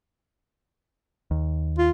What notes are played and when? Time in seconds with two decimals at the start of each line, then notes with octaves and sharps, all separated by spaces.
1.31 D#2
1.78 F4